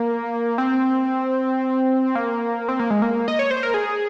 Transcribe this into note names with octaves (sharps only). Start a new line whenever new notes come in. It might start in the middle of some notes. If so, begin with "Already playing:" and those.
Already playing: A#3
C4
A#3
C4
A#3
G#3
A#3
D#5
C#5
C5
A#4
G#4